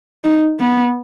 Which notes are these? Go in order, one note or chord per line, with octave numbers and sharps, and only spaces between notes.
D#4
B3